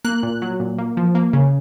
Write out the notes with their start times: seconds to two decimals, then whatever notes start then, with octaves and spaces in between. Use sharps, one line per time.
0.05 A#3 F#6
0.23 A#2
0.42 F#3
0.60 A#2
0.78 A#3
0.97 F3
1.15 A#3
1.33 C#3